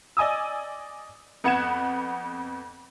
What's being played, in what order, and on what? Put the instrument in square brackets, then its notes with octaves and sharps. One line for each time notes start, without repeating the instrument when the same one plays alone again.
[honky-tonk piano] D5 D#5 G#5 D#6 E6
F2 B3 F#5 G#6 E7